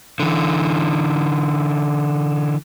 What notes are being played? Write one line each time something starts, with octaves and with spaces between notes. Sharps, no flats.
D3 E3